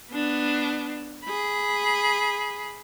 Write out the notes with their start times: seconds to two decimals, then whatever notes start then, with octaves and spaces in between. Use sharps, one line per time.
0.11 B3 D4
1.24 G#4 B5